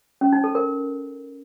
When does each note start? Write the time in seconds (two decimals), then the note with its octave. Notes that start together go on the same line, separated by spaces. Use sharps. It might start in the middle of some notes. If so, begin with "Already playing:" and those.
0.21 C#4
0.32 D#4
0.44 A4
0.55 A#4